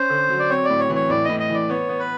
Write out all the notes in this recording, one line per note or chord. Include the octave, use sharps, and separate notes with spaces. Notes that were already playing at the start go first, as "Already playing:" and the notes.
Already playing: C#4 C5
D3
F#3
D5
C4 C#5
A2 D5
C#5
E3
C#5
A2 D5
A2 D#5
D#5
E3 D5
B3 C#5
B3
B4